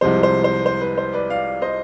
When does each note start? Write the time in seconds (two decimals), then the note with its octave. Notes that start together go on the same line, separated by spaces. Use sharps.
0.01 C2 C3 F3 G#3 C5
0.23 C5
0.44 C5
0.66 C5
0.81 B4
0.98 C5
1.13 B4 D5
1.30 D5 F5
1.62 C5 D#5